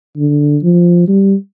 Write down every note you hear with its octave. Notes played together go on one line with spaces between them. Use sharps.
D3
F3
G3